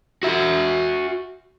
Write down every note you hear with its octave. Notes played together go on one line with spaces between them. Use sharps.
F#4 E5